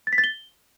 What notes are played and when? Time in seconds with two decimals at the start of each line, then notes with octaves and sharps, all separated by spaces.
0.07 A6
0.13 B6
0.18 A6
0.24 G7